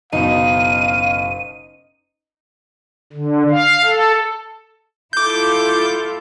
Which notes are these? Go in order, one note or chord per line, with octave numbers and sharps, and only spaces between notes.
F#1 B2 D#4 F5 D#7
D3
F5
A4
E4 F4 A4 D6 G6